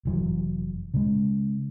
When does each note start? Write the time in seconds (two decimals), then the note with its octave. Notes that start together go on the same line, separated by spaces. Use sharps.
0.05 F1 E3 F#3
0.94 C#3 G#3